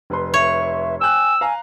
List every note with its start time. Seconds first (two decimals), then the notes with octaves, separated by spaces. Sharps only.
0.10 F1 B4 C6
0.34 C#5 E5
1.01 G5 G#5 E6 F#6
1.41 F5 G#5 A#5